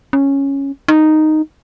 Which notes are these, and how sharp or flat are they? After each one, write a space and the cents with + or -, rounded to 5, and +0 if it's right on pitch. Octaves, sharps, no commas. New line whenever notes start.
C#4 -5
D#4 -5